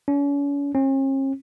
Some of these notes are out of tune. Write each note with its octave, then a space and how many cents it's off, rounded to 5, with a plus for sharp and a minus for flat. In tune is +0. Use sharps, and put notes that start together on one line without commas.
C#4 +40
C#4 -45